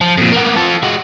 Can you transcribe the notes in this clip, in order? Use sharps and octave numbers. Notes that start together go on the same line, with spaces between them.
F3
F2 A#2
A#3 B3
F4 A4
G#3 F#4